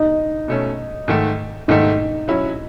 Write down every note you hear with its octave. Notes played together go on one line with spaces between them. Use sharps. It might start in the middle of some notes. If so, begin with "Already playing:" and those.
Already playing: D#4
B2 A3 C#4
G#2 D#3 A3
G#2 D#3 A3 D#4
F#3 C#4 E4